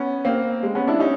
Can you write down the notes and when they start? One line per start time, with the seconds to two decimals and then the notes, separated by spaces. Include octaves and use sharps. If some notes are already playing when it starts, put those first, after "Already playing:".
Already playing: B3 C#4
0.25 A#3 C4
0.63 G#3
0.75 B3 C#4
0.87 D4 E4
1.00 C#4 D#4